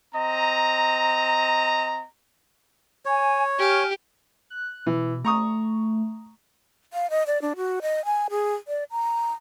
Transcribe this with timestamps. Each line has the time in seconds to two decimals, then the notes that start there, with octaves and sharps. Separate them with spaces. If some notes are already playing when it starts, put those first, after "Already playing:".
0.14 C4 D#5 A#5
3.06 C#5 G#5
3.58 G4 G#5 F6
4.50 F#6
4.86 B2 E3
5.24 A3 A#5 C#6 D#6
6.93 F5
7.10 D#5
7.27 D5
7.42 D4
7.56 F#4
7.82 D#5
8.05 G#5
8.30 G#4
8.68 D5
8.91 A#5